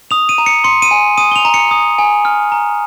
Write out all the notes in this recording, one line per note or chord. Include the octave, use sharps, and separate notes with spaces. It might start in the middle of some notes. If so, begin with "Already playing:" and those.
D#6 F7
D#7
A#5
C#7
C6 C#7
D#7
G#5
D#6 D#7
G7
F7
A#5
C#7
D#6
G#5
F6
A#5